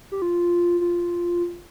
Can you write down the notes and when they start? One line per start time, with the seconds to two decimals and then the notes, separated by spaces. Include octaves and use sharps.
0.12 G4
0.22 F4
0.81 F4